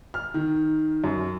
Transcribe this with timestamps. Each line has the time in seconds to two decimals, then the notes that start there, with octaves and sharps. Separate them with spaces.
0.14 F6
0.34 D#3
1.04 F#2